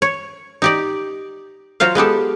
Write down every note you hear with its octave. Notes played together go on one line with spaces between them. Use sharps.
C#5
D#4 G4 D5
F#3 F4 C5 F5
G#3 B3 G4 A4